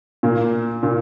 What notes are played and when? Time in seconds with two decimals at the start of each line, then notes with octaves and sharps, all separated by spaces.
0.23 A#2 A#3
0.83 A#2 A#3